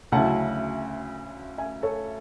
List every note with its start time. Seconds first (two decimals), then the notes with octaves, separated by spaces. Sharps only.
0.12 D2 C#3 F#3 C#4 E4 F#5 A5
1.58 E5 G#5
1.83 A4 C#5